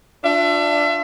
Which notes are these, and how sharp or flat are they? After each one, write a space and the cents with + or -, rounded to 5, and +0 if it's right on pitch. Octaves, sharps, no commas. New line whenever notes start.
D4 +5 F4 +20 E5 +35